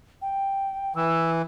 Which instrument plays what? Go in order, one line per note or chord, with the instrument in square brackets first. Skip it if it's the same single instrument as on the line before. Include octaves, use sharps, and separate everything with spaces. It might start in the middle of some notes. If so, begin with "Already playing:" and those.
[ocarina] G5
[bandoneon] E3 [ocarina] E6